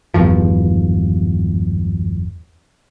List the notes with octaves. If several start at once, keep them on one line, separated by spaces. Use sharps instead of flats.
G#1 E2 G2 F3